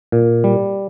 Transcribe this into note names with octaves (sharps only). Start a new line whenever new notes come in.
A#2
G3